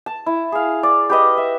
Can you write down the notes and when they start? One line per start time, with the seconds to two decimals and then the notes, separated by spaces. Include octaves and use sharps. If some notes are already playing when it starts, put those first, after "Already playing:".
0.06 A5
0.26 E4
0.52 G#4 F5
0.83 D5
1.10 G4 B4 D#5
1.37 E5